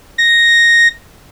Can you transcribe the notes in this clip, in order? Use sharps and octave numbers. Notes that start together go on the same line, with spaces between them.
A#6